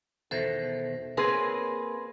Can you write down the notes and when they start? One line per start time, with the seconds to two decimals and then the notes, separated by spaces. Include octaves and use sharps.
0.31 E2 B2 D#3 A4 C5 E5
1.17 A#3 C4 G#4 A#4 B4 C#5 G#5